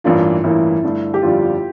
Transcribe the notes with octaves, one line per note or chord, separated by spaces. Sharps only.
A1 G2 E3 A#3 D4 F4
A1 G2 E3 A#3 E4
G2 D3 A3 D4
G4
G1 F2 D3 G3 F4